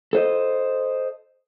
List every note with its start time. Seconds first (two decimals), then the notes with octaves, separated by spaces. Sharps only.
0.13 A4 C5 D#5